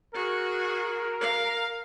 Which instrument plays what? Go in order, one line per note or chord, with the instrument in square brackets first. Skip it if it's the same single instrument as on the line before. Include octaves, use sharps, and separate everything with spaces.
[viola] F#4 G#4 [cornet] A#4
[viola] F5